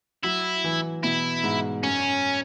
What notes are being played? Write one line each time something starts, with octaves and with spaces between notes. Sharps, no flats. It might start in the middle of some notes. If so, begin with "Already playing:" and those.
F#3 E4
E3
B2 E4
G#2
F#2 C#4